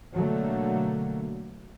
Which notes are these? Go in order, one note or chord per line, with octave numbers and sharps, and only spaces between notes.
B2 D3 F#3 A3 A#3